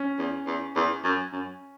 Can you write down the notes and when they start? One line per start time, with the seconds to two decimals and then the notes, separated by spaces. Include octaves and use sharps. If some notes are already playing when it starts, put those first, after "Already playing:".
Already playing: C#4
0.18 E2
0.46 E2
0.75 E2
1.04 F#2
1.32 F#2